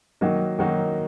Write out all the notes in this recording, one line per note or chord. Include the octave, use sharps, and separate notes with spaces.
D#3 F#3 A#3 D#4 F#4
D#3 F#3 A#3 D#4 F#4